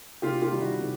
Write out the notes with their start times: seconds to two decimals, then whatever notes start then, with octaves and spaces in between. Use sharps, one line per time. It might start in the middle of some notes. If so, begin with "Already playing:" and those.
0.22 C3 F4 G4
0.41 F4 G4
0.52 D#3 G3
0.61 E4 F#4
0.80 C3